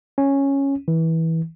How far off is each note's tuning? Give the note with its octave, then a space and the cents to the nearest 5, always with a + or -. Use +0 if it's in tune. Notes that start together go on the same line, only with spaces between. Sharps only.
C#4 -5
E3 -20